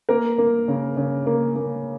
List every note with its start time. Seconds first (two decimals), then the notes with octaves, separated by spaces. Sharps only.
0.09 A#3 A#4
0.38 A#3
0.68 C#3
0.97 C#3
1.26 A#3
1.56 A#3